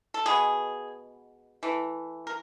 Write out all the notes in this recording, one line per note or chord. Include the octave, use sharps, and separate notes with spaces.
A4
B2 G#3 B3 G#4
E3 A3
A#4